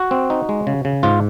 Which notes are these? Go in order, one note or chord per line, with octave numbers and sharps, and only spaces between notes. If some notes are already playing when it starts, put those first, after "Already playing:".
Already playing: F#4
C4
D#4
G#3
C#3
C#3
G#2 F4